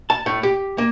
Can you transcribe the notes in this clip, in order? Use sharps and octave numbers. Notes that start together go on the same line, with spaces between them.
A5
A2
G4
A#3